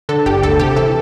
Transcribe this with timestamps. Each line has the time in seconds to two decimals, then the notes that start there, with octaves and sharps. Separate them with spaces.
0.09 D3 A4
0.26 G1 G4
0.43 D2 A4
0.59 C3 G4
0.76 E3 A4